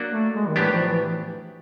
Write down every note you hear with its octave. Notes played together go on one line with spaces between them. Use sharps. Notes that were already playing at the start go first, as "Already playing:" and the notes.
Already playing: F#3 A#3 D4 F#4
A3
G#3
D#3
A2 E3 F#3 B3 D4 G4
F3
E3